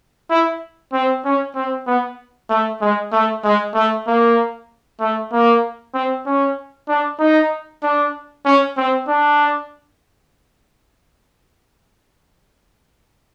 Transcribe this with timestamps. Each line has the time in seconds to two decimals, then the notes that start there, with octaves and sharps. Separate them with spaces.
0.30 E4
0.93 C4
1.25 C#4
1.55 C4
1.87 B3
2.50 A3
2.81 G#3
3.12 A3
3.44 G#3
3.75 A3
4.07 A#3
5.00 A3
5.33 A#3
5.94 C4
6.26 C#4
6.88 D4
7.20 D#4
7.83 D4
8.46 C#4
8.77 C4
9.08 D4